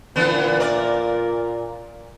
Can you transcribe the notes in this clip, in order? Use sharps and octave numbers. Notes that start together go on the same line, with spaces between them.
A#2 D3 E3 B3
A#4 D5